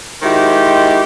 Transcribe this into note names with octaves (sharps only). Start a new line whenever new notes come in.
D#3 G#3 E4 F#4 G4 C5